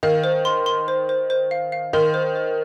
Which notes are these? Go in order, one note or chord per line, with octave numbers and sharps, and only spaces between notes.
D#3 F5
C5
C6
C6
C5
C5
C5
F5
F5
D#3 C6
C5
C5